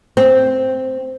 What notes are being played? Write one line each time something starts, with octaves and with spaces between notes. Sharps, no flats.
C4